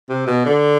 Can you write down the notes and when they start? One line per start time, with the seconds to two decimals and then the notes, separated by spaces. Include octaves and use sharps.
0.09 C3
0.27 B2
0.46 D3